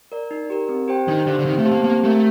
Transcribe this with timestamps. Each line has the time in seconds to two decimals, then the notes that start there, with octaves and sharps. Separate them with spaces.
0.12 A#4 D5
0.31 D#4
0.50 G4 A#4
0.69 C4
0.88 G4 C5 G5
1.08 D#3 D4
1.26 D3 G4 C5 F5
1.39 D3
1.46 D#3 C4
1.59 A3
1.65 G4 C5 F5 A5
1.71 A#3
1.84 A#3 C4
2.03 A3 G4 A#4